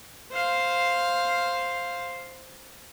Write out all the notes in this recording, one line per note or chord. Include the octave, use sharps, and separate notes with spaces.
C5 F5